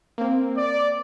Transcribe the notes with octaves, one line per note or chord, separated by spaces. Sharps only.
A#3 C4
D5